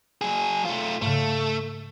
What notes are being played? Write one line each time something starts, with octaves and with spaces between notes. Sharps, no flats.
F#3 G#4
A3 F4
G#2 C#3 A3